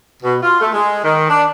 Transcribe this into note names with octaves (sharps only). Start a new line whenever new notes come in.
B2
F4
A3
G#3
D#3
D4